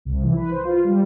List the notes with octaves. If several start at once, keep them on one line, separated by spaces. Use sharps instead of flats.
C2
E3
B4
C5
F4
G3